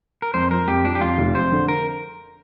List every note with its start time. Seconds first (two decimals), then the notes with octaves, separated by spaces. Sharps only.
0.22 A#4
0.34 F2 C5
0.51 F3 A#4
0.68 F2 G4
0.84 F3 D4
0.95 G4
1.01 F2 F4
1.18 F1
1.35 F2 C5
1.52 D3
1.68 A#4